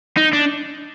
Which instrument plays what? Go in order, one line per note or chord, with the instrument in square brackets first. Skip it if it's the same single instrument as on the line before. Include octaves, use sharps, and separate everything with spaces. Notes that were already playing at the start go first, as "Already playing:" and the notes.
[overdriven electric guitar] D#4
D4